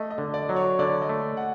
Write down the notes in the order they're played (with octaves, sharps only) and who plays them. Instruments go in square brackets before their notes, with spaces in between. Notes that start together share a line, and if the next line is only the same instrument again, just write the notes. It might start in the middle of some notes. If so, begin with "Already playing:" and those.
Already playing: [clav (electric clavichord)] A3 [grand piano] D#5
[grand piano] D#5
[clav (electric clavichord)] D3
[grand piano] D5
[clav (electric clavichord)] F#3
[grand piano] C#5
[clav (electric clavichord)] D3 [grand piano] D5
[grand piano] D#5
[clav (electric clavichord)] A3
[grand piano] F#5